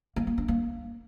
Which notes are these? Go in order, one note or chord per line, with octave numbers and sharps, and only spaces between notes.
A#3
A#3
D4
A#3